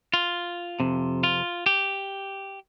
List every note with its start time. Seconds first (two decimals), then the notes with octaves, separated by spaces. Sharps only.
0.14 F4
0.80 F2 C3
1.23 F4
1.66 G4